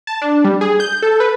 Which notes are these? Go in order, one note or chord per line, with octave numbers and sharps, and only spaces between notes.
A5
D4
G3
G#4
G6
A4
B4